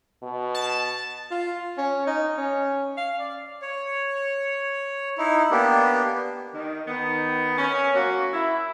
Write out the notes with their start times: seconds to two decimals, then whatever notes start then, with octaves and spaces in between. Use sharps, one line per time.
0.23 B2
0.55 A5
1.31 F4
1.78 C#4
2.07 D#4
2.37 C#4
2.97 F5
3.19 D5
3.62 C#5
5.18 D#4 E4
5.51 A#3 B3 D4 G4
6.53 D#3
6.87 D#3 B3
7.57 C#4
7.95 F#3 A#3 F#4
8.33 E4